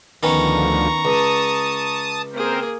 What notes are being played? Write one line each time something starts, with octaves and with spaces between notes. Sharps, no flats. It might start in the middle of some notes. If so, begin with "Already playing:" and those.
D2 D3 D#3 F3 B3 C#4 A#5 C#6
C#2 A5 D#6
A#3 C4 G#4 A#4 C5